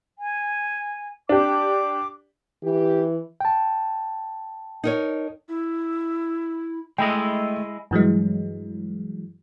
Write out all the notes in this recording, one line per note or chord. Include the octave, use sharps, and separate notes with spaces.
G#5
D4 G4 D6
E3 G4
G5 A5
D#4 A#4 C#5
E4
G#3 A3 E4 D#5 G5
G2 E3 F#3 G#3